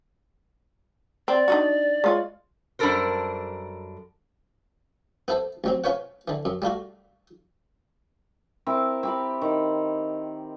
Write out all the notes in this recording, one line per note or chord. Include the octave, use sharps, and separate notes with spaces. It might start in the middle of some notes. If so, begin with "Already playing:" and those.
C4 D5
D4 D#4 F#4
G#3 F4 C#5
F#2 G3 D4 A4 A#4 C5
B3 E4 A4 C5
A1 F#3 C4
C#4 F4 B4 C#5 F#5
D3 E3
F#2
G3 A3 F4 F#4
C4 E4 A#4
C4 G4 B5
D#3